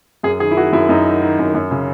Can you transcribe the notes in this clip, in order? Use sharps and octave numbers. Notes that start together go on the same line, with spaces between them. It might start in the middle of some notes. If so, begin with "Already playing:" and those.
F#2 G#4
D#3 G#4
E4
D#3 F#4
F#2 E4
F#2 D#4
D#3
D#3
F#2
F#2
C#3